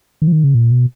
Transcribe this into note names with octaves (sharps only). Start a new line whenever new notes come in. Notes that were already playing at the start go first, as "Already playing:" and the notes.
D#3
F3
D#3
C#3
A#2
B2